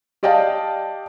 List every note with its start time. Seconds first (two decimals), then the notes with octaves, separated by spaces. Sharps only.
0.23 G4 D5 D#5 F5 G5 A5